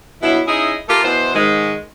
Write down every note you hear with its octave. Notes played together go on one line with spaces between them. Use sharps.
G2 B2 F#3 E4
C#4 D#4 E4 G#4 D#5 E5
A3 F4 G4 A4 A#4
B2 E3 C5
G#2 D#3 G#3